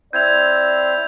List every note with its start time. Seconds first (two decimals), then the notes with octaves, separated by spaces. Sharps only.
0.13 C4 E4 C5 D5 G6 G#6 F7